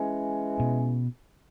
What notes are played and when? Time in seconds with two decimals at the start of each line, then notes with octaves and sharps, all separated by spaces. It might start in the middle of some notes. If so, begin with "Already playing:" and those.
Already playing: E3 G#3 C#4 G#4
0.60 B2